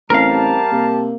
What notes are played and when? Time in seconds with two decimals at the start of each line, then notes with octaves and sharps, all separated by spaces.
0.10 A1 G3 C4 G4 A#4 F5 A5
0.72 C3 A#3